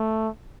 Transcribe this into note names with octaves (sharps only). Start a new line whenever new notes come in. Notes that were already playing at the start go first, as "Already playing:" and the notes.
Already playing: A3